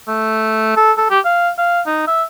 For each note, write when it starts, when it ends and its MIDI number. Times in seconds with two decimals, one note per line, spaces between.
0.08 0.73 57
0.77 0.92 69
0.98 1.08 69
1.11 1.20 67
1.25 1.50 77
1.58 1.81 77
1.87 2.08 63
2.08 2.24 76